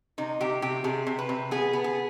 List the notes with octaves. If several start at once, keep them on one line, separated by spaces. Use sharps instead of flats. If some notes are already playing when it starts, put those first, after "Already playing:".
C3 D#4
C3 G4
C3 G4
C3 G#4
C3
B4
C3
B3 G#4
B3
G#4